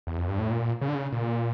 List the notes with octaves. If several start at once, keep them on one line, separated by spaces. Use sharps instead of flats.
E2
F2
G2
A2
A#2
C#3
D3
C#3
A#2